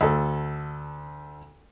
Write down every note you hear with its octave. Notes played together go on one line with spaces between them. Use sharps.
D2 A4